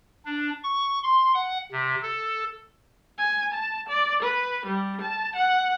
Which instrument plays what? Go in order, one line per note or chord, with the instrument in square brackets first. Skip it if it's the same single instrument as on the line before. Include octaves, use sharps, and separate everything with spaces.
[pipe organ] D4
C#6
C6
F#5
C3
A4
[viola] G#5
A5
D5
B4
G3
A5
F#5